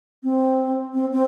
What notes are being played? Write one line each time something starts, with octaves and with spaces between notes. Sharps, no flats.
C4
C4
C4